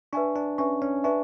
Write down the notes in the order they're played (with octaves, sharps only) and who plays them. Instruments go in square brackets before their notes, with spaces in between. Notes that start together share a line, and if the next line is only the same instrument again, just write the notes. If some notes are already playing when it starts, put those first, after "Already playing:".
[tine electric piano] D4 [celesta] B4 E5 G#5 C#6
[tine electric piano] D4
[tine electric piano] C#4 [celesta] B4 E5 G#5 C#6
[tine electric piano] C#4
[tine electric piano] D4 [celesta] B4 E5 G#5 C#6